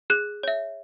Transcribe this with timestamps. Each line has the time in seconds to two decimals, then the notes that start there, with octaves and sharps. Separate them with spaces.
0.10 G#4 F#6
0.43 C#5 E5